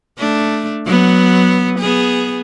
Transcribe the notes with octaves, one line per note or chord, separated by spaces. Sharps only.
A3 D4
F#3 B3
B3 G#4